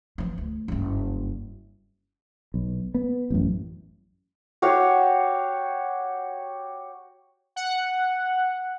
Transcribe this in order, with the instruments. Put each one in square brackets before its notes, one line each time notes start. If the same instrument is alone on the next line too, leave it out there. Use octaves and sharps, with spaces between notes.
[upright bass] E3 F3
D2
F#1 G2
[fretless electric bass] B1
B3
A1 F#2
[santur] F#4 G4 C#5 F5
[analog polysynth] F#5